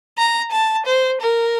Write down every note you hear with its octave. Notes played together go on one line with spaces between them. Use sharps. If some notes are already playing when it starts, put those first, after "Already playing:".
A#5
A5
C5
A#4